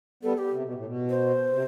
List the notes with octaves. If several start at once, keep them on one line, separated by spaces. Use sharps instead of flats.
G3 B3 A4
G4
C3
B2
A2
B2
C5
C3